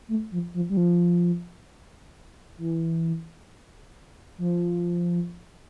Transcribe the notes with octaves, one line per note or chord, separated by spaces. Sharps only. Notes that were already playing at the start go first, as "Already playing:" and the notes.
A3
F3
F3
G3
F3
E3
F3